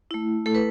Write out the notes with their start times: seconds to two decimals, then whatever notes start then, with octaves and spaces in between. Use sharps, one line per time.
0.11 A3 E4
0.46 A3 E4 A4
0.55 B4